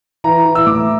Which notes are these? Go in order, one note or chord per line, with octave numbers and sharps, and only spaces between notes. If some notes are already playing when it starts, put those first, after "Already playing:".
E3 A#5
E3
E6
A2 D6